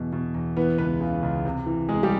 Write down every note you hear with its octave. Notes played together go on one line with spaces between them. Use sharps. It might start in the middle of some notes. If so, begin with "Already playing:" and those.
Already playing: E2 B2
B2
E2
E3 B3 B4
C#2 B3 B4
C#3
C#2
C3
E3
C3 G#3 G#4
G3 G4